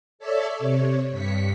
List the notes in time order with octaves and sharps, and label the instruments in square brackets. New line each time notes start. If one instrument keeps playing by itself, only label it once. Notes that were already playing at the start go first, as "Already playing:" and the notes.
[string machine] A4 C#5 D5 E5
C3 C#5
G2 B6 C#7